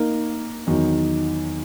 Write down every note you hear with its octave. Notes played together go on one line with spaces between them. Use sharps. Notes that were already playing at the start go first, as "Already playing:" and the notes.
Already playing: A#3 D#4 A#4
E2 D#3 F#3